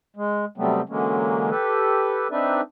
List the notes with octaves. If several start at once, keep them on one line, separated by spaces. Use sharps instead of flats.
G#3
C3 F#3 G3 A3 B3 C4
D3 E3 F#3 G#3 A#3 C#4
G4 A4 B4
C4 D4 D#4 B4 D5 E5